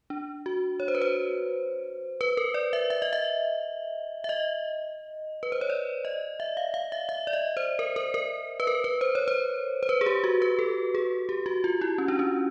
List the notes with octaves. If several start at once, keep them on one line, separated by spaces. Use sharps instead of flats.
D4
F#4
C#5
C5
B4
C5
B4
A#4
D5
E5
E5
D#5
E5
E5
D#5
B4
C5
C#5
D5
D#5
E5
F5
F5
E5
E5
D5
D#5
C5
A#4
A#4
A#4
B4
A#4
B4
C5
C#5
C5
C5
B4
G#4
G4
F#4
B4
A4
G#4
G4
F#4
F4
E4
C#4
D4
C#4